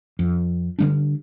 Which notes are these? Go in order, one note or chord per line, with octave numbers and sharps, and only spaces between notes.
F2
D3 G3 D4